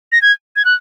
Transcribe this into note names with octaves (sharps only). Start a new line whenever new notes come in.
A#6
G#6
G#6
F#6